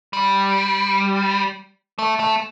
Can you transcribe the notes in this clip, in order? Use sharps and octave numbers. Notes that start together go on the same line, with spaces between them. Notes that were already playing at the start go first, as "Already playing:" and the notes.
G3
A3
A3